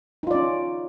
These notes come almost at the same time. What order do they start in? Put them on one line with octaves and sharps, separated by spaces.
D#4 F4 D5 C#4